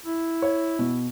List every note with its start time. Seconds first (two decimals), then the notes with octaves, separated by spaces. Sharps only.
0.06 E4
0.42 C#5
0.79 B2